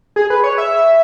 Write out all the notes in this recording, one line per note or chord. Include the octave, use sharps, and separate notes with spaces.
G#4
B4
C#5
E5